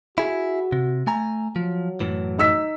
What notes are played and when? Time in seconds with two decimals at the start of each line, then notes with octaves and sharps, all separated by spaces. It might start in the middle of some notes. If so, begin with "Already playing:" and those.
0.18 E4 F#4 G#4
0.72 C3
1.07 A3 G#5 A#5
1.56 F3 F#3
2.00 F#2 A2 E3
2.38 D#4 E6 B6